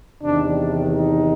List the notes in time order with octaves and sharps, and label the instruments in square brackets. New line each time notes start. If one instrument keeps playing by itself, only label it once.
[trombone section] E2 C3 D#3 D4
D#4